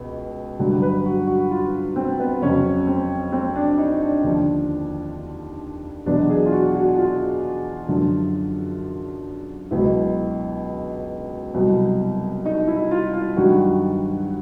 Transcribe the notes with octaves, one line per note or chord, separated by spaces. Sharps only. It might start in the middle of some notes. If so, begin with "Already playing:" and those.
Already playing: C#2 B2
G2 D3 F#3
B4
F#4
F#4
F4
C4
B3
F2 C#3 F#3 C#4
C4
C4
D4
D#4
D4
D#2 D3 F3
E2 B2 F#3 D4
G#4
F4
F#4
F#4
F4
F#2 D3 F3
C#2 B2 F#3 E4
C2 B2 F#3
D#4
E4
F4
F4
G2 D#3 F#3 F#4